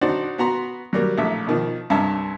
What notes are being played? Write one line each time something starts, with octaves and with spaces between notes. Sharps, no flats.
D4 D#4 F#4 C5 D5
B3 F#4 A#5 C6
F#3 G3 A#3
A#1 A2 E5
B2 D#3 F3
C2 G2 E5 A5 A#5